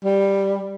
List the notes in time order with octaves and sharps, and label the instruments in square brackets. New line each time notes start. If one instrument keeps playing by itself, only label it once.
[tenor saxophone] G3